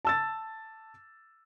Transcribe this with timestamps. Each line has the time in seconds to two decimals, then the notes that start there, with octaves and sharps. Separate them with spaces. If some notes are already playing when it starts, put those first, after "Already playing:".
0.05 A5 E6 A6